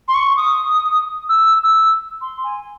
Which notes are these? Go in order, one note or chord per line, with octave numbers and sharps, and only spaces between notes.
C6
C#6
D#6
E6
E6
C6
G#5